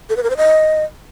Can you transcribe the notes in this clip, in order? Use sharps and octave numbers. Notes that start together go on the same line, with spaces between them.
A4
B4
A#4
C5
D#5